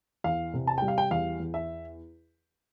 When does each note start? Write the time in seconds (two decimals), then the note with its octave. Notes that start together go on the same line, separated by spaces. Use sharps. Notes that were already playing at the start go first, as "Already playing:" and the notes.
0.24 E2 F5
0.54 C3
0.67 A5
0.78 G3 G5
0.88 F5
0.98 G5
1.11 E2 F5
1.40 E2
1.54 E5